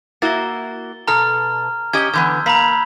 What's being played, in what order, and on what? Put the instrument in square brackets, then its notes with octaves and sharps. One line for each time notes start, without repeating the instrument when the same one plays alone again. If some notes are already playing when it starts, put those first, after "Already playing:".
[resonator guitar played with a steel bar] A#3 E4 F#4 [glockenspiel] A6 G7
[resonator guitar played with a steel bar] B2 A4 [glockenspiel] A#5 F6
[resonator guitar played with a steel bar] C#4 G4 D#5 [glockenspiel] G#6 G7
[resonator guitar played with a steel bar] D3 E3 B3 [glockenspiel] E6 G6 G#6
[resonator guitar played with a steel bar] A#3 [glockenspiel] A#5 B5 B6